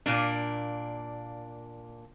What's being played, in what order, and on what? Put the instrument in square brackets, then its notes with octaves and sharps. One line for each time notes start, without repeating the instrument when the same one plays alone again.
[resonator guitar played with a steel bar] A#2 A#3 D4